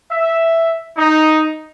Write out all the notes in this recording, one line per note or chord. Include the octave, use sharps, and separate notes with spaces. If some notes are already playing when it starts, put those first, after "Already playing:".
E5
D#4